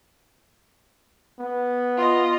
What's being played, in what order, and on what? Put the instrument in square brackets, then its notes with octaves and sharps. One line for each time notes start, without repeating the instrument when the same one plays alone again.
[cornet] B3
[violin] F4 D#5